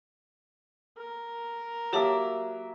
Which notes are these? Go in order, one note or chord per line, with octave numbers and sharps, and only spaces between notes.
A#4
F#3 A#3 G4 C#5 E5 A5